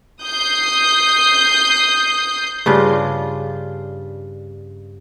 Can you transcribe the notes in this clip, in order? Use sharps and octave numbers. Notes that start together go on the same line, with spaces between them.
D#6 G6 C7
G2 C#3 D4 F4